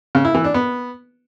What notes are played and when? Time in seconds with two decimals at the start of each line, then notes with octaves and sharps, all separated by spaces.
0.15 C#3
0.25 E4
0.35 E3
0.44 D4
0.54 B3